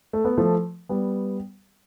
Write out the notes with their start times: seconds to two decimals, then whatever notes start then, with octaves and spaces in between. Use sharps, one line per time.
0.13 A3
0.25 B3
0.38 F3 A3
0.89 G3 B3